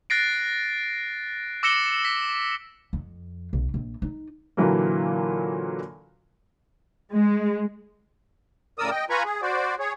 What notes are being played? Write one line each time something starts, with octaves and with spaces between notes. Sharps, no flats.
F#6 A6 A#6 C7 D7
D6 E6 A#6 C#7 E7 G7
B6
F2
B1
A#1
D#4
A#2 D3 E3 F#3 A#3
G#3
A2 C#3 A#4 D5 D#6 E6
D#5 G5
F4 B4 G#5 A#5 B5 C#6
G#4
F#4 C5 D5
G#4 C#5